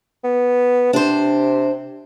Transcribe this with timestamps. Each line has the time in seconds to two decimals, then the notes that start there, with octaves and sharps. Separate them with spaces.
0.24 B3
0.93 C3 D4 C5